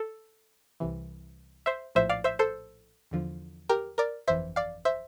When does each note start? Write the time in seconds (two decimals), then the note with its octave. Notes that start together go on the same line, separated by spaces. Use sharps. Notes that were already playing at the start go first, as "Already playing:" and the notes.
Already playing: A4
0.80 C2 C3 E3
1.66 C5 E5
1.95 A#1 A2 F3 C5 E5
2.09 D5 F5
2.24 C5 E5
2.39 A4 C5
3.11 E2 D3 F3
3.69 G4 A#4
3.98 A#4 D5
4.28 G1 F2 E3 C5 E5
4.56 D5 F5
4.85 C5 E5